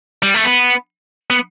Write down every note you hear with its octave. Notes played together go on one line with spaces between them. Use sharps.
G3
A3
B3
B3